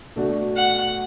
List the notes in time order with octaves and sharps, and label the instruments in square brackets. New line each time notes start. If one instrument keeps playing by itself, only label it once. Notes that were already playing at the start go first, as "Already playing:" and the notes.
[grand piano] B2 A3 D4 F#4
[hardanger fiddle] F#5